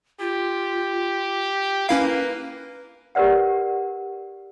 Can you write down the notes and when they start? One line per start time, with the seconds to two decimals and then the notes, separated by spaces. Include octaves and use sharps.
0.20 F4 G4
1.89 A#3 C#4 E4 B4 F5
3.15 G4 A#4 B4 D5 F#5